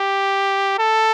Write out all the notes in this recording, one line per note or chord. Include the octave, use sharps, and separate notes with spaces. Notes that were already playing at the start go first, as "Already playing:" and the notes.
Already playing: G4
A4